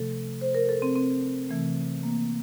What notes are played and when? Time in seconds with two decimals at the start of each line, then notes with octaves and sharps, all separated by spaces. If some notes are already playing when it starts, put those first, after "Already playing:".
Already playing: C3 F3 A3 A4
0.41 C5
0.55 A#4
0.69 A4
0.82 C4
0.96 C4
1.49 C3 E3 A3
2.03 A#3